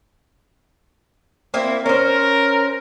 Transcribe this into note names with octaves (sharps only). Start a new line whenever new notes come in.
A#3 C4 E4
C#4 A#4 C5